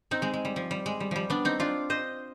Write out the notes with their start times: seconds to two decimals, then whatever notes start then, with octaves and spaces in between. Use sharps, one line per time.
0.11 C4 D#4
0.22 G#3 C4
0.34 G#3
0.45 G3
0.56 F3
0.71 G3
0.86 G#3
1.00 G3
1.11 F3 G3
1.30 B3 D4
1.45 C4 D#4
1.60 D4 F4
1.90 C5 D#5